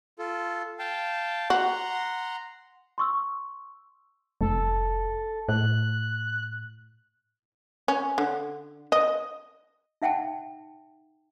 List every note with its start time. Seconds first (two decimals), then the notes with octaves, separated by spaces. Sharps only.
0.19 F4 A4
0.79 F5 G5 A5
1.50 F#4 F#5 A#5 C6
2.98 C6 C#6 E6
4.41 F1 A4
5.49 A2 F#6
7.88 C#4
8.18 D3
8.92 D#5
10.02 D#4 E5 F#5 G5 A5